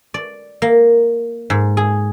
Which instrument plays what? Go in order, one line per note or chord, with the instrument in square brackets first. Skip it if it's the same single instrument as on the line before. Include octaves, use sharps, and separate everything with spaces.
[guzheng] D5
A#3
G#2
G#4